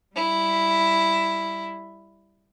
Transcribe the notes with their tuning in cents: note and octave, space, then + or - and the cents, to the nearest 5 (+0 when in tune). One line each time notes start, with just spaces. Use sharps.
G3 -5 E4 +0